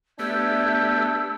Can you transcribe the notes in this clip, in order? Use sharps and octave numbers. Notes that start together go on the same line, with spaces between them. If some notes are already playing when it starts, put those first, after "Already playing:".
A3 B3 D4 G4 E5 E6 G6 G#6